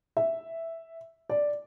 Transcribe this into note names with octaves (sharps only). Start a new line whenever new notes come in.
E5
D5